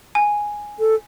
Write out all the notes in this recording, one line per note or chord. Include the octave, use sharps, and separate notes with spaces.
G#5
A4